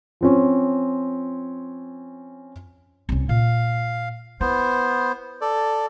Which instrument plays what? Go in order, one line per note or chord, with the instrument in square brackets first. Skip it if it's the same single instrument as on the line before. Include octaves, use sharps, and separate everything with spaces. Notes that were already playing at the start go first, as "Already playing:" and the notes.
[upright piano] F3 C4 C#4
[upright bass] C2 C#4
[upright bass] A#2 [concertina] F5
[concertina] B3 C5 [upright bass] E4
[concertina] A4 D5